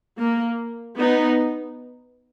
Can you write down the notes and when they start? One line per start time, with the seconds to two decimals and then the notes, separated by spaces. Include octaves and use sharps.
0.18 A#3
0.99 B3 D#4